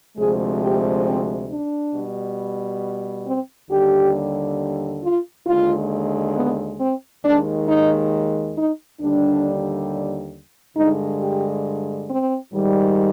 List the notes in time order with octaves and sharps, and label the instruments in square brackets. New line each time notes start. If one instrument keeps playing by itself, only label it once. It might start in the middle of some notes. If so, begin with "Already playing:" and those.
[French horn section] D2 C3 F3 G#3 G#4
G4
C4
D4
B2 G3
C4
D#2 D3 G3 G4
F4
D#2 D3 G#3 F4
B3
C4
D#2 D#3 G#3 D4
D#4
D#4
D#2 D3 G3 D4
G2 D3 G#3 D#4
G4
C4
G#2 D#3 G3